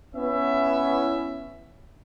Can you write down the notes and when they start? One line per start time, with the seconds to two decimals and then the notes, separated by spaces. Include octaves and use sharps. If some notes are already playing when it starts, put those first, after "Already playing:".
0.15 B3 C#4 E4 E5